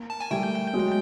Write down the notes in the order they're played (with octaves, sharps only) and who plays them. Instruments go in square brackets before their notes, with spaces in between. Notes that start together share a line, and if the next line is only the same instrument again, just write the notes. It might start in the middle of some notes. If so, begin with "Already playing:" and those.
Already playing: [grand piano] A#3
[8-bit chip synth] A5
G#5
[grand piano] G3 A3 [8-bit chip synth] G5
[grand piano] F#3 G#3